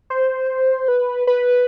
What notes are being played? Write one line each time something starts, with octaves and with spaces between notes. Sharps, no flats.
C5
B4
B4